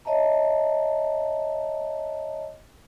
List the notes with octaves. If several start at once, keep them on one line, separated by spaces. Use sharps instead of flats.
C#5 D#5 E5 A5 A#5